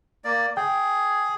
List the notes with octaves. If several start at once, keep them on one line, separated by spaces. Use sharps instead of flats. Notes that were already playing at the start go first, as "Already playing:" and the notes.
A#3 D5
G#4 G5